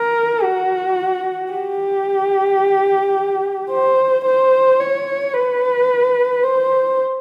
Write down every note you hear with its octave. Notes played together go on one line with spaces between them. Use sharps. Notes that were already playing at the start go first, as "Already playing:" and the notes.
Already playing: A#4
F#4
G4
C5
C5
C#5
B4
C5